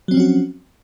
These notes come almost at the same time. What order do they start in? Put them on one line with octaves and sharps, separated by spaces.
F#3 C4 F3 C#4 F#4